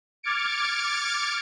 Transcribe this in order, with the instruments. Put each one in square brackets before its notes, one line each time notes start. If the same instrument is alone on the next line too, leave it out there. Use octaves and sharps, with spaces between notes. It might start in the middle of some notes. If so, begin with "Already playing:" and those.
[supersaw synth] D6 F6 G#6 A6 C#7 D7